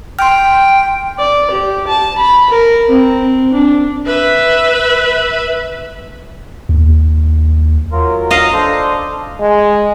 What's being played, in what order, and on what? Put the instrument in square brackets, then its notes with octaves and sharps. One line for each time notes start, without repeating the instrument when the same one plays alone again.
[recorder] G5 [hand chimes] C6 F6
[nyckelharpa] D5
G4
A5
B5
A#4
C4
D4
[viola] B4 E5
[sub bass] D#2
[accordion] F#3 F4 A#4
[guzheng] D#5 F5
[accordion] D4 A4 C5
[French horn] G#3